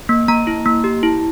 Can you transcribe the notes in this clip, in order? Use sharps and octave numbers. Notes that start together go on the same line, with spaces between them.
A#3
A#3 A#5
E4
A#3
G4
E4